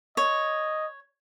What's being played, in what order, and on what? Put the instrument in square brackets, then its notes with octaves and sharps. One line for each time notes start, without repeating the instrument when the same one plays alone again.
[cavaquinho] C#5 [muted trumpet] D#5